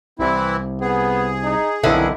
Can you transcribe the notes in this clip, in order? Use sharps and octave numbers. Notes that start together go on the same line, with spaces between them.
C2 E3 C4 E4
B3 G#4
D#4
B1 F2 D3 D#3 E4